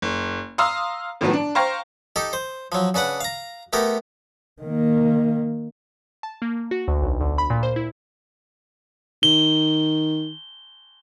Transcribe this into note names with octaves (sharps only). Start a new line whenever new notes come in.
F#1
F5 A#5 C6 D#6 E6
A2 D#3 F3 F#3 B3
D4
C5 F5 G5 A#5 C#6 A#6
D#4 G4 A4
C5
F3 F#3
C#3 D4 B4 F#5
F5 A#5
A3 B3 G4 A#4
D#3 A#3
A5
A#3
F#4
D2
B1
D2
B5
A#2
C5
E4
D#3 G7